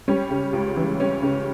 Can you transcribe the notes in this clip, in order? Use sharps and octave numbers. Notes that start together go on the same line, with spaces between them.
G3 C#4
C#3
C#2
E3
G3 C#4
C#3